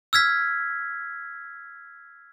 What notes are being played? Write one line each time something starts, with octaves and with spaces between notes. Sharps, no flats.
E6 F6 G#6 B6